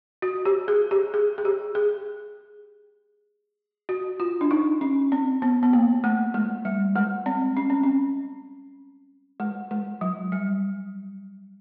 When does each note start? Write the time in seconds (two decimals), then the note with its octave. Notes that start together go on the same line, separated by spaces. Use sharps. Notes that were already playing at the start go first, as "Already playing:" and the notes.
0.22 F#4
0.45 G4
0.68 G#4
0.91 G4
1.14 G#4
1.38 G#4
1.45 G4
1.75 G#4
3.89 F#4
4.20 F4
4.41 D4
4.51 D#4
4.81 C#4
5.12 C4
5.42 B3
5.63 B3
5.73 A#3
6.04 A3
6.34 G#3
6.65 G3
6.96 G#3
7.26 C4
7.57 C#4
7.70 C4
7.83 C#4
9.40 G#3
9.71 G#3
10.01 F#3
10.32 G3